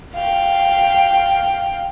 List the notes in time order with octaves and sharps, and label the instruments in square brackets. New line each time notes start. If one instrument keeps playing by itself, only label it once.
[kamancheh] F5 G5